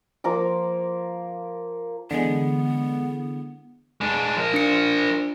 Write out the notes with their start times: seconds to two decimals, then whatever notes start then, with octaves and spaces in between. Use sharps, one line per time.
0.24 F3 A#3 A#4 D6
2.11 D3 E3 G#3 B3
4.01 G#3 D4
4.36 F3 A#4
4.54 D4 C#7